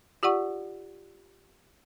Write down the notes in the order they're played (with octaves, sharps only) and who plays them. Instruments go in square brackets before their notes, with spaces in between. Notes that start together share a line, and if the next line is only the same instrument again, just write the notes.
[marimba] F4 G4 D5 F#5 C#6